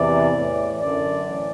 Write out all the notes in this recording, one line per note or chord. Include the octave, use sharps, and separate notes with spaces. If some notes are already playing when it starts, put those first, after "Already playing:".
Already playing: E2 C3 E3 D5
A2 E3
F#2 D3 D5
A2 E3